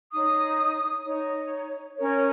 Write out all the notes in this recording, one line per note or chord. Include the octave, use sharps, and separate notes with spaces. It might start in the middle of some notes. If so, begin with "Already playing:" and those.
D#4 C#5 D#6
D#4 C#5
C#4 A#4 C#5